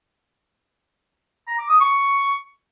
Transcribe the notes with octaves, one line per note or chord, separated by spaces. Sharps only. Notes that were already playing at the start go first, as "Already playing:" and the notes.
A#5
D6
D#6
C#6